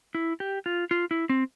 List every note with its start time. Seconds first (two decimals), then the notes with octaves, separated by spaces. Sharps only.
0.15 E4
0.40 G4
0.66 F4
0.91 F4
1.11 E4
1.30 C4